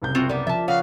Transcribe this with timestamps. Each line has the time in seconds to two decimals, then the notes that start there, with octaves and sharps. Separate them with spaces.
0.02 F#1 C2 G6
0.15 C4 F4 F#4
0.29 G3 B3 A#4 D5
0.47 F3 E5 A5
0.68 C#3 C#5 F5 F#5